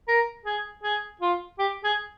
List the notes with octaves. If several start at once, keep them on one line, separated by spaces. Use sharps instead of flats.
A#4
G#4
G#4
F4
G4
G#4